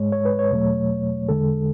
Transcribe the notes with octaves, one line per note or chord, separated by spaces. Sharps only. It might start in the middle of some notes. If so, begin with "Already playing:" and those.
Already playing: G#2 G#3 C#5
C#5
B4
C#5
E2 B2 F#3 A3
E2 D3 G#3 A4